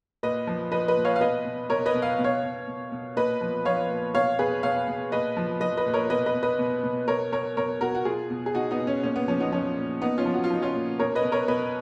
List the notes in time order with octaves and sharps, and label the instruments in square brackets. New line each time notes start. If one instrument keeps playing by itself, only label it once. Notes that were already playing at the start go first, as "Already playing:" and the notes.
[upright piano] A#2 B4 D#5
F3
F3 B4 D#5
B4 D#5
A#2
C#5 F5
F5
B2 B4 D#5
B2
B2 A#4 C#5
B4 D#5
B2
F5
B2
C#5 F5
B2
B2
B2
A#2 B4 D#5
F3
F3 C#5 F5
A#2
B2 C#5 F5
B2 G#4 B4
B2 C#5 F5
B2
A#2 B4 D#5
F3
F3 B4 D#5
B4 D#5
A#2
A#4 C#5
B2 B4 D#5
B4 D#5
B2
B4 D#5
B2
B2
B2 A#4 C#5
B2 A#4 C#5
B2 A#4 C#5
B2 F#4 A#4
F#4
B2 F4 G#4
B2
G#4
B2 D#4 F#4
B3 D#4
B2
C#4
A#2 C#4
B3
F3 C#4
B3 D#4
F3 C#4
A#2
A#2 B3 D#4
C#4 F4
F3
F#4
F4
F3 D#4
C#4 F4
A#2
B2 A#4 C#5
B4 D#5
B2
A#4 C#5
B2 B4 D#5